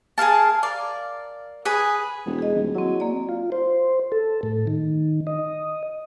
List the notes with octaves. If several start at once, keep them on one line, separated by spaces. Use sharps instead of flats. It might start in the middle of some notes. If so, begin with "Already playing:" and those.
G#4 A#4 F5 A5
A#4 D5 F5
G#4 B4 G#5 D#6
E1
G#4 D#5
D#1
F#3 C4 E4
A#3 D5
F4
C5
A4
A2
D#3
D#5